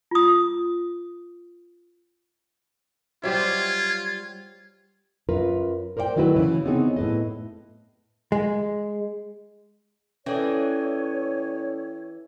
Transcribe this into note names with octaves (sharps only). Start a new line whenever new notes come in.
F4 D#6
F#3 G3 F4 G4 C5 E5 G#6
F#2 F4 A#4 B4
A#4 C5 D5 F5 G5
D#3 F#3 A3 E4 F#4 B4
C#3 E3
B3 C4 D#4 G#4 C#5
A2 B4 D#5
G#3
E3 C#4 A4 C#5 D5